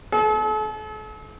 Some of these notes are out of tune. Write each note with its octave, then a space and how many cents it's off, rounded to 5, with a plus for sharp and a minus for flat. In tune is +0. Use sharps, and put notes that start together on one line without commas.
A4 -40